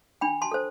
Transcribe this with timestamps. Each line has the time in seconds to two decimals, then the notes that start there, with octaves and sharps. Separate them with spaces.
0.21 D4 G5 B5
0.42 A5 C6
0.52 A4 C5